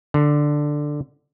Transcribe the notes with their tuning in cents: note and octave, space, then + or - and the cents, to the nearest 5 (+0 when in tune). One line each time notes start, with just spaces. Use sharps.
D3 +5